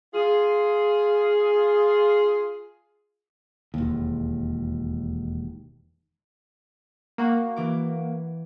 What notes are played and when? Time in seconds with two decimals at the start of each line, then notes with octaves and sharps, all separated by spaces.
0.14 F4 G#4
3.74 E1 D#2
7.18 A#3 F#4
7.56 E3 D6